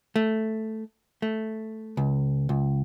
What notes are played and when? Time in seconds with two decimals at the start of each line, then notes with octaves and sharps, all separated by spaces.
0.16 A3
1.22 A3
1.97 C#2
2.49 C#2